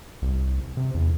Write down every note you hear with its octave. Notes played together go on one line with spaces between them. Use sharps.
C2
C3
E2